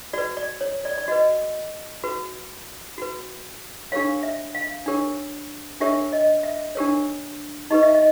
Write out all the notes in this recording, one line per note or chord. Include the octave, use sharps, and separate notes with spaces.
F#4 B4 D5
D5
C#5
D5
D5
F#4 B4 D#5
F#4 B4
F#4 B4
D4 G4 A#4 C#5 F5
E5
F5
D4 G4 A#4 C#5
D4 G4 A#4 C#5 E5
D#5
E5
D4 G4 A#4 C#5
D#4 G4 B4 D#5
E5
D#5